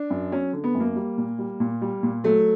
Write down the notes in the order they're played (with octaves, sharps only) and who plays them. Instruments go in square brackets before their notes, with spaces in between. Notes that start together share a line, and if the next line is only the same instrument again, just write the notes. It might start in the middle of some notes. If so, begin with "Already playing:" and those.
Already playing: [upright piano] D4
F#2
F#3 C#4
D3
B3
F#2
A#3
G3
A#2
G3
A#2
G3
A#2
F#3 A3